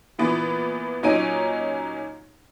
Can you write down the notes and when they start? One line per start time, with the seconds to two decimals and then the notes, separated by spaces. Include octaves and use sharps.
0.19 A#2 E3 B3
1.03 A#2 F#3 C#4 D#4 D7 D#7